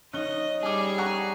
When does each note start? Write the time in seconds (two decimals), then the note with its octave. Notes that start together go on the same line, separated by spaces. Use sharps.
0.13 C#4 D#4 D#5 F#6 G7
0.63 G3 G#4 G#5 D6
0.98 F#5 A#5 C#6